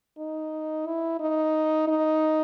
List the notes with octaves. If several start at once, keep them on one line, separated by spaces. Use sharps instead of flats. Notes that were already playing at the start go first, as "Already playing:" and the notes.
D#4
E4
D#4
D#4